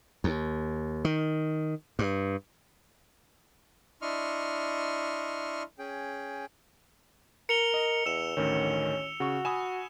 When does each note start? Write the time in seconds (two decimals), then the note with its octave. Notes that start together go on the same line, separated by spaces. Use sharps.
0.24 D#2
1.05 D#3
1.99 G2
4.02 D4 E4 D#5 C6 C#6 F6
5.79 C#4 G#4 G5
7.49 A#4 C#7 F7 G7
7.74 D#5
8.06 E2 E6 E7
8.37 A1 D2 D#3 C#4
9.20 C#3 F#4 C#6
9.45 G#5 B5 D#6 E7